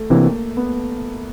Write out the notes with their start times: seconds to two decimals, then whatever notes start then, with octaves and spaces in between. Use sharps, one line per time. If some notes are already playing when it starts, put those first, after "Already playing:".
Already playing: A3
0.10 C3 E3 A#3
0.57 B3